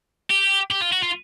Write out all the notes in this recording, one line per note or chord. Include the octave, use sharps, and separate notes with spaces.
G4
G4
F4
F#4
F4